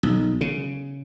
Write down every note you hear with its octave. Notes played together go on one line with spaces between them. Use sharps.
B1
C#3